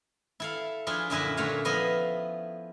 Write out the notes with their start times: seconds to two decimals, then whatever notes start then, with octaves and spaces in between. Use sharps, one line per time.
0.40 E4 A4 F5
0.87 F3 D4 E4 F4 G#4
1.10 F#2 A#2 D3 E4 D#5 E5
1.37 A#2 D3 A3 C#5 F5
1.65 F3 B3 E4 D#5 F5